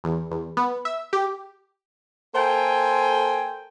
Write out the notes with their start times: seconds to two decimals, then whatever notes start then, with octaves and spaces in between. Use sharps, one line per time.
0.04 E2
0.31 E2
0.57 B3
0.85 E5
1.13 G4
2.35 A#3 A4 C5 G5 G#5